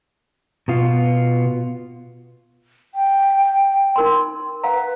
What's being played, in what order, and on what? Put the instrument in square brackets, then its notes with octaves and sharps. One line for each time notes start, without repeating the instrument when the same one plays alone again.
[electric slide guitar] B2 B3 F4
[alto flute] G5
[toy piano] D#4 A#4 C6
[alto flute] B4 [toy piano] F5 F#5 A#5